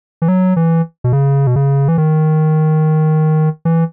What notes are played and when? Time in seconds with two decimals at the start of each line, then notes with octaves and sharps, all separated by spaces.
0.22 E3
0.28 F#3
0.56 E3
1.04 B2
1.12 C#3
1.47 B2
1.56 C#3
1.88 E3
1.98 D#3
3.65 E3